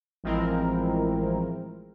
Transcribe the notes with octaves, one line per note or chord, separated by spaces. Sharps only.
A1 F3 G#3 C4 E4 A#4